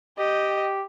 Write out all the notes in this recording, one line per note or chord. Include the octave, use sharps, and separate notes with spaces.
G4 D#5 G5